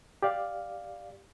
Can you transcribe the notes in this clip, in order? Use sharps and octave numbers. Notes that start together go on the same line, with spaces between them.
G4 D5 F5